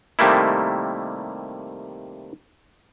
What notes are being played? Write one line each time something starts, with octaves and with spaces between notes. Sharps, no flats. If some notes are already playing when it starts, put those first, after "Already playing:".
C3 D#3 G3 A3 A#3 E4